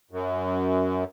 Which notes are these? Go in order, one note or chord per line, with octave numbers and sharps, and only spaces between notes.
F#2